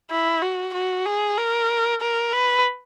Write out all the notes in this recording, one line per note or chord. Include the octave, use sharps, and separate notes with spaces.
E4
F#4
F#4
G#4
A#4
A#4
B4